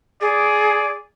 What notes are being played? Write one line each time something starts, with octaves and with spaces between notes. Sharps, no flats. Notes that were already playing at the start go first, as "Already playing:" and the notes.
G#4 D5